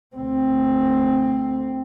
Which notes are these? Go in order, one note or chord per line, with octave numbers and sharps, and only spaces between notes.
D2 C4